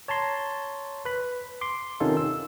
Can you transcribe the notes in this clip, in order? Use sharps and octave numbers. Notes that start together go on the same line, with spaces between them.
C#5 A5 A#5 C6
B4 B5
C6 D6
C3 D#3 C#4 D#4 F4 A4
E6